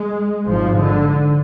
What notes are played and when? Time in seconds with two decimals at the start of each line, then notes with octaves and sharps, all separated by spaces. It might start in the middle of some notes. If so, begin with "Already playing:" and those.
Already playing: G#3
0.47 G#1 G#2 F3
0.81 D3